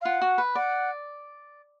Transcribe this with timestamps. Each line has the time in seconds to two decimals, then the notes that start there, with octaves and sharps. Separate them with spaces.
0.01 F5
0.05 F4 F#5
0.21 F#4
0.38 B4
0.55 D5 F#5